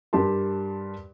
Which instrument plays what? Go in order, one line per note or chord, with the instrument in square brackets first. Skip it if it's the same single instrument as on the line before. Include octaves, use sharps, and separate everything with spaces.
[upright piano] G2 G3 G4 A#4 A5 C6